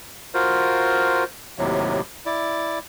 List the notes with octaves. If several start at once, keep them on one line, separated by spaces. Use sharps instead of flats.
F4 F#4 A#4 C5
D#2 A2 C3 F#3
E4 D5